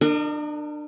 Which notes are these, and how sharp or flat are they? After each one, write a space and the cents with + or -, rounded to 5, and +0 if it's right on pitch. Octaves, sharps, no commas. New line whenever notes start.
D4 +30 A#4 -30 D#5 -15